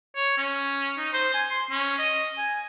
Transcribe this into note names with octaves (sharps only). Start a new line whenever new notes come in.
C#5
C#4
D#4
C5
G#5
C6
C#4
D#5
G#5